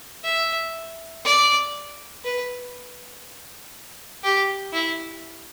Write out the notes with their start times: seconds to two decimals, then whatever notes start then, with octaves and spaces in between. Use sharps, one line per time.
0.24 E5
1.25 D5
2.25 B4
4.24 G4
4.73 E4